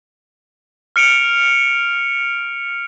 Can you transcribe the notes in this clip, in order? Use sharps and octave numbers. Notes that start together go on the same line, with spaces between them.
F6 C#7 D7 F7